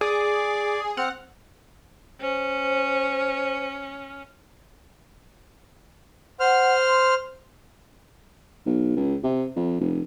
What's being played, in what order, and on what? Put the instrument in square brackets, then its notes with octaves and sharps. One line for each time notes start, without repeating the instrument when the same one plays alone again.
[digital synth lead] G#4 [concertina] D5 D6
[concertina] C4 F6 [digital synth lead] F#5
[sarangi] C#4 [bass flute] C5
[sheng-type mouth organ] C5 F6 [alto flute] F#5
[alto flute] C6
[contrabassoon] B1
C#2
C3
F2
F1